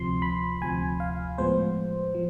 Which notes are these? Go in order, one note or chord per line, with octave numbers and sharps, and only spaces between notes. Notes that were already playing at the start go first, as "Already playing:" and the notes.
Already playing: D2 C3 F3 C6
B5
D2 C3 F3 G#5
F5
A2 F3 G#3 B3 C5
F3